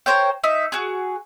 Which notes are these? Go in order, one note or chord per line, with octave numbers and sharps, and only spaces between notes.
A#4 C5 C#5 G5
D#4 E5
F#4 G#4